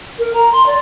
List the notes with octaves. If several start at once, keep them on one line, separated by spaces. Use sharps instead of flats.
A#4
A#5
C6
D5